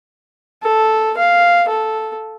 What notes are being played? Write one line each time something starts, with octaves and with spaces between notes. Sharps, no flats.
A4
F5
A4